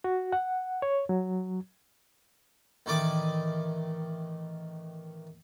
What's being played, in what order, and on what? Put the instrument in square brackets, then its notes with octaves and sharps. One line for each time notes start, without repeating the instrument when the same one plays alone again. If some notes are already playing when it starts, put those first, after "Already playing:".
[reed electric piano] F#4
F#5
C#5
F#3
[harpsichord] A1 D#3 E4 D5 D6 D#6